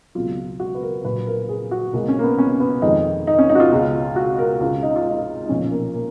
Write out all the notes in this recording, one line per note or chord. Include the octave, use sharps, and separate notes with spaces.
C#2 B2 F#3 F4
F#4
B4
A#4
A#1 A#2 F#3 B4
A#4
G#4
F#4
B1 B2 G#3 A#3
C#4
A#3
B3
C#4
B3
F2 D#3 G#3 D#4
D#4
C#4
D#4
F#4
F4
C#2 B2 G#3
F#4
A#4
C#2 C#3 G#3 F4
D#4
F4
D#4
D#4
B1 A#2 F3 C#4
A#3
A#3